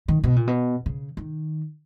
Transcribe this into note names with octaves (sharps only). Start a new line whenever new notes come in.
D#3
B2
A#2
B2
C#3
D#3